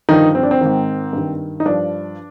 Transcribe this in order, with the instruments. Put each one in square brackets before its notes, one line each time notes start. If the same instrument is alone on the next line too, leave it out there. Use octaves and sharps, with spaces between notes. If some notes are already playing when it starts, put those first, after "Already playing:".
[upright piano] G2 D3 D#3 F3 D#4
C4
D4
C4
G#2 D#3
G2 D#3
D#4
G2 F3 D4